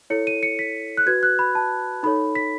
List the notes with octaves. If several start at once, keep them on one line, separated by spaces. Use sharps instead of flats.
E4 A4 C#5 C#7
D#7
C#7
B6
F#6
F#4 B4 G#6
F#6
B5
A5
D#4 A4 C#5 B5
B6